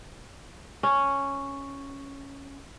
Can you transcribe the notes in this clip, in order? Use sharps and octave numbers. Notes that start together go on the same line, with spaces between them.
C#4